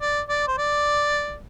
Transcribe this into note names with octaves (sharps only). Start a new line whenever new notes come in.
D5
D5
C5
D5